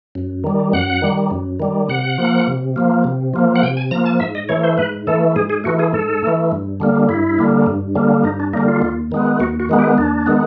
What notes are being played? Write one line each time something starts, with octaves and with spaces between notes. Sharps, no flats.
F#2
D#3 G3
F#2 F#5
D#3 G3
F#2
D#3 G3
C3 F#5
F3 A#3
C3
F3 A#3
C3
F3 A#3
F#5
C3 G5
G#5
F3 A#3 A#5
A5
G#2 E5
D#5
E3 A3 C#5
C5
G#2 B4
E3 A3 A4
G#2 G#4
G#4
E3 A3 F#4
G#4
G#2 A4
E3 A3
G2
D3 G3 A#3
G2 E4
D3 G3 A#3
G2
D3 G3 A#3
G2 D#4
D4
D3 G3 A#3 D#4
F4
D#2
D#3 G#3 B3
D#2 F#4
F#4
D#3 G#3 B3
G4
D#2 D4
D#3 G#3 B3